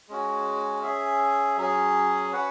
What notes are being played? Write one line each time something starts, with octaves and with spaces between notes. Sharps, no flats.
G#3 C#4 F#4
C#4 G#4 E5
F#3 C#4 G#4
C#4 F#4 B4 F#5